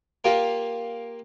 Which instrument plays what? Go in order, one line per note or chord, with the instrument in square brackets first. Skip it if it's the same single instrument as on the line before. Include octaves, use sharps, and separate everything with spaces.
[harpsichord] A#3 F4 G4 A#4